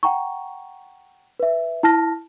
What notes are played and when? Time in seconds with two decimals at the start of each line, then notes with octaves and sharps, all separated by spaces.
0.03 F#5 G5 A#5 C#6
1.40 B4 E5
1.83 E4 A5 F6 A#6